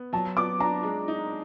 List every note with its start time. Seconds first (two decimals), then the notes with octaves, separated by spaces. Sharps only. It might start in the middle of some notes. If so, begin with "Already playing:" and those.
Already playing: B3
0.13 F#3 A5
0.37 B3 D6
0.60 D4 A#5
0.83 G#3
1.08 D#4